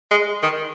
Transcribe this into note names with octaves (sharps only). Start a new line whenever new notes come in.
G#3
D#3